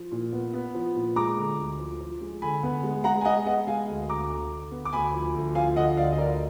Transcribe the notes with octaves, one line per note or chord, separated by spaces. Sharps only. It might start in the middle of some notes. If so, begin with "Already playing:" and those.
Already playing: F3
A#2
B3
B3
F3
A#2
G#3 A#5 D6
D3
D2
F3
F3
G#3
D3 G#5 B5
B3
G#3
G#3 F#5 A#5
G#5
G#3 D#5 F#5
B3 D#5 F#5
G#3 F5 G#5
D2
D2 A#5 D6
D3
D3
B3
D6
D2 G#5 B5
F3
D2
F3 F5 G#5
D3 D#5 F#5
D2 D5 F5
D#5
F3 A#4 D5